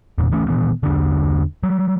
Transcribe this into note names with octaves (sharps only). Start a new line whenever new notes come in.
E2 A#2
D2 E3 A3 C#4
A#2 D#3 E3 B3
E2 G2 D3
F#3 G3